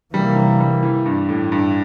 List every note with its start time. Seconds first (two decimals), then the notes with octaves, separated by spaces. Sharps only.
0.13 C3 E3 G3 A#3
0.36 G3
0.60 G3
0.83 E3
1.06 G2
1.29 A2
1.52 G2